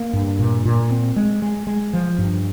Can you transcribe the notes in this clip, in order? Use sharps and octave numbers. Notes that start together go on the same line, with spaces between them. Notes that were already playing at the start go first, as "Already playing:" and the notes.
Already playing: A#3
G2
A#2
A#2
C4
G#3
G#3
G#3
F3
G2